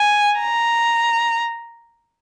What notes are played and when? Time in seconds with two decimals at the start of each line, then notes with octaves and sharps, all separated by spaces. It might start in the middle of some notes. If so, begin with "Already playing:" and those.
Already playing: G#5
0.40 A#5